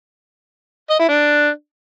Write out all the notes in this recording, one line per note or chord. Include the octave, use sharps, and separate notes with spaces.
D#5
E4
D4